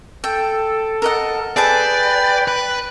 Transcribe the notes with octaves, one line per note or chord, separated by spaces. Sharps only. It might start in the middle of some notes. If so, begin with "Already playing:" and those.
A4 G5
A#4 D#5 F#5
G#4 A4 B4 D5 G5 A5
B4 F#6